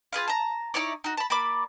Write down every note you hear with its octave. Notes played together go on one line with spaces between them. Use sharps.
F4 G#4 B4 F5
A5 A#5
D#4 E4 C#5 D5
D#4 F#4
A5 B5
A#3 D5 B5 D6